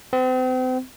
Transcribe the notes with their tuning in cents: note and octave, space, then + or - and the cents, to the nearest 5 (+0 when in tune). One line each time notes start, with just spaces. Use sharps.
C4 -40